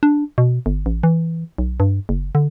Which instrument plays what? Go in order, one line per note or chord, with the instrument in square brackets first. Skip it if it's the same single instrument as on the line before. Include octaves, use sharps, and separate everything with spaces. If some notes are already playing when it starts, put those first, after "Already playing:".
[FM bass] D4
B2
G1
A1
E3
B1
G2
F#1
D3